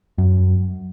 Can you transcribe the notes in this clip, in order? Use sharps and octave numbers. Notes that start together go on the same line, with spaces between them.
F#2